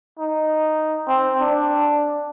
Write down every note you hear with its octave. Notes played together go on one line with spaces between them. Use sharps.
D#4
C4
D4